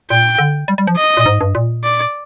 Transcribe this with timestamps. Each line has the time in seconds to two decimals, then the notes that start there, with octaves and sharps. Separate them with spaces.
0.10 A#2 G5
0.38 D3
0.68 G3
0.78 G3
0.87 F3
0.97 D#5
1.17 A#2
1.26 G#2
1.41 G2
1.55 A#2
1.84 D5